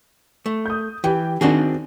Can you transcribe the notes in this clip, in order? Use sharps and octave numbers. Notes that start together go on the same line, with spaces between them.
A3
D#6 G6
E3 G4 G5
D#3 C4 D4 F#4 G#4